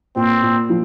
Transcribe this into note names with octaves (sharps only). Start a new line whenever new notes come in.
A#2 C4
A#2
F3